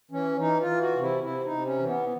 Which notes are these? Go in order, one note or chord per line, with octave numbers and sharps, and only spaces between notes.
E3 C#4
E3 D#4
F4
E3
F#4
C3
E4
C3 E4
D#4
C3
C#4
E3
B3